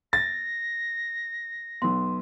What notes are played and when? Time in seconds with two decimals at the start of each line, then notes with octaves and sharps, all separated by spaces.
0.13 A6 A#6
1.82 B1 B3 C6